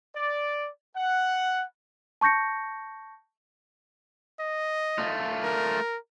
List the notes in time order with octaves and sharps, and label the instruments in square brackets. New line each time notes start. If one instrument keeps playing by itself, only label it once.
[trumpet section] D5
F#5
[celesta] A5 C#6 G6 A#6 C#7
[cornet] D#5
[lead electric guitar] A3 F4
[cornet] A#4